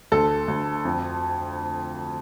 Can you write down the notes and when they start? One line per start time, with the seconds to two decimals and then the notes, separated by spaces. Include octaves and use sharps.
0.12 D2 A4
0.48 D2
0.85 F2